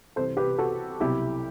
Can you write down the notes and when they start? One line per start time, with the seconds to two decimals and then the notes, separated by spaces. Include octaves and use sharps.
0.16 C2 C3 E3 A4 C5
0.37 G4 B4
0.58 F#4 A4
1.00 C2 B2 F#3 E4 G4